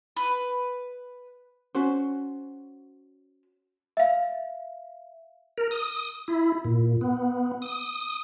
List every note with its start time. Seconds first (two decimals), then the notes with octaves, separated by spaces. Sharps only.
0.17 B4
1.75 C#4 F#4 C5
3.97 E5 F5
5.58 A#4
5.71 D#6
6.28 E4
6.65 A#2
7.01 B3
7.62 D#6